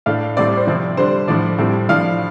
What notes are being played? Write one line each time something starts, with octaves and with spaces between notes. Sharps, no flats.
A2 A3 D4 F5
A2 G3 C4 D5
D5
C5
C3 F3 C4 D5
D3 G3 D4 C5
A2 F3 D4 D5
A2 G3 C4
A2 F3 D4 F5